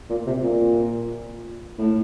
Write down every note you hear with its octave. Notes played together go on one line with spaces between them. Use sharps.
A#2
C3
A#2
A2